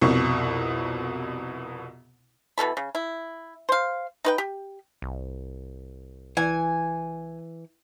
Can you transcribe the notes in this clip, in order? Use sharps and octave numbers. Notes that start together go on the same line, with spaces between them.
C2 F2 B2 C#6
B2 E3 A4 B5
C#3
E4
C5 F5
D#4 B4 G5
G4
C2
E3 G#5